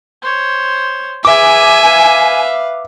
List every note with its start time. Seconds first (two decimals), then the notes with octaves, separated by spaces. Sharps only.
0.22 C5 C#5
1.25 G#4 B4 E5 G#5 D6
1.84 B4 F5